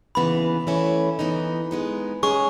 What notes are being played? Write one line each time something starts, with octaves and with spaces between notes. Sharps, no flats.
D#2 C#3 E3 B3 B5
E3 A3 C#4 E4
E3 B3 D#4
G#3 B3 D#4
G#3 C#4 G#4 C#6